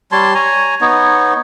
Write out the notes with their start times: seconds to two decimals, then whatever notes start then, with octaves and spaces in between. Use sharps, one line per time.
0.12 G3 C#5 A5 C6
0.35 C#5 G#5 A#5
0.81 B3 D#4 C#5